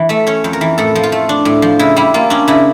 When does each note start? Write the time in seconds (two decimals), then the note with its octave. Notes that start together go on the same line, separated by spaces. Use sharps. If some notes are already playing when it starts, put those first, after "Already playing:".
Already playing: E3
0.09 A3 E5
0.27 C#4 C#5
0.44 F2
0.53 A#4
0.61 E3
0.78 A2 A4
0.95 F3
1.03 F4
1.12 A3
1.29 D4
1.45 A2
1.62 F3
1.79 C#3 E4
1.96 G3 E4
2.14 A#3 F4
2.30 C#4 D4
2.48 C#3 E4